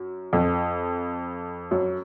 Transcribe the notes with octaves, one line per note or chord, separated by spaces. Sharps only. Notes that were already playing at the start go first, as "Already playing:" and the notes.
Already playing: F#2
F2
F#2